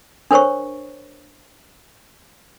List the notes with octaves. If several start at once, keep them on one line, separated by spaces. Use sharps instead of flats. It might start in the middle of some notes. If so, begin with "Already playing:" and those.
D4 A#4 C5 C#5 C#6